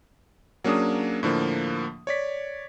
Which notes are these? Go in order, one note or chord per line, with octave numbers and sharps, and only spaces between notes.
F#3 A#3 C#4 D4 G#4 D#6
A2 D3 F3 A#3
C#5 D5 B6